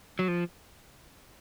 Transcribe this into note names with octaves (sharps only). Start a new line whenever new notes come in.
F#3
F3